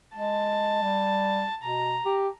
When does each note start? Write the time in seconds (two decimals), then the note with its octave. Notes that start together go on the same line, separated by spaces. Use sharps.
0.17 G#3 A5
0.82 G3
1.63 B2 A#5
2.05 G4